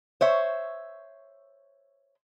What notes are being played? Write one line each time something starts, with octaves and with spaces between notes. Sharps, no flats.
C5 C#5 E5